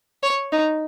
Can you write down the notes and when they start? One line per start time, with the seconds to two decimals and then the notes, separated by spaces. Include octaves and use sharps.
0.23 C#5
0.52 D#4